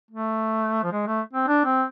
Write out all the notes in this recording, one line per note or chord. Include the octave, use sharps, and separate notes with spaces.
A3
F3
G#3
A3
C4
D4
C4